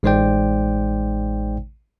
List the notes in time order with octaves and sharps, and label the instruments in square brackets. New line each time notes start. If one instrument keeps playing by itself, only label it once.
[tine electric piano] A1 G#3 D#4 C5 D5 G5